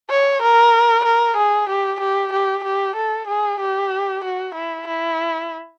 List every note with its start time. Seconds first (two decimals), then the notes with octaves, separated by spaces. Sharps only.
0.10 C#5
0.42 A#4
1.05 A#4
1.37 G#4
1.69 G4
2.00 G4
2.33 G4
2.64 G4
2.96 A4
3.27 G#4
3.60 G4
4.24 F#4
4.55 E4
4.87 E4